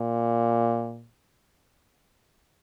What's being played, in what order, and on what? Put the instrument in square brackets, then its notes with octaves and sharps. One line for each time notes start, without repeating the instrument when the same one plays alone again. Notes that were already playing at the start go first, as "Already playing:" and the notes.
Already playing: [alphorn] A#2